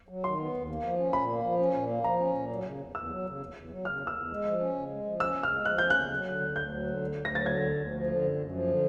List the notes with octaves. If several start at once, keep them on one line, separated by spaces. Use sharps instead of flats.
F#3
D#3 C6
B3
D#2
A#3
F3
C#4
A#2 B5
A#3
F3
C#4
A#2
A#3
F3 A#5
C#4
A#2
F#3
C#3
E2
E2 E6
F#3
C#3
E2
E2
F#3
C#3 F6
E2
E6
E2
G#3
F3
C#4
C#3
G#3
F3
C#4 E6
C#3
F6
G#3
F3 F#6
C#4 G6
C#3 F#6
F#3
D3
D2
D2 G6
F#3
D3
D2
D2
A#6
F#3 A6
D3 G#6
D2
D2
F3
D3
F#2
F#2
F3
D3